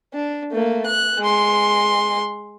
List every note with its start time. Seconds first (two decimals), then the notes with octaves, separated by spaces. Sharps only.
0.14 D4
0.52 A3 A#3
0.86 F#6
1.19 G#3 C6